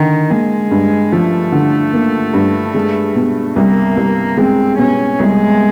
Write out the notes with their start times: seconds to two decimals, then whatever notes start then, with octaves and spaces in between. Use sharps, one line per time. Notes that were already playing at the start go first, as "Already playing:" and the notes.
Already playing: D3 D#3
0.30 G#3 A#3
0.71 G2
1.12 F3 A3
1.52 D3
1.93 A#3
2.34 G2
2.74 G#3
3.16 B2
3.56 C2 A#3
3.97 C2
4.37 G#3 C4
4.78 B2 C#4
5.19 C2 G#3